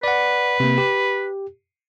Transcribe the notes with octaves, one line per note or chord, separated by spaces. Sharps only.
B4 D5 F#5
C3 A#3
G4